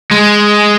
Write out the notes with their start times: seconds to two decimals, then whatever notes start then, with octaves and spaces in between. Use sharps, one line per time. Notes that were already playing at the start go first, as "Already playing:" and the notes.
0.11 G#3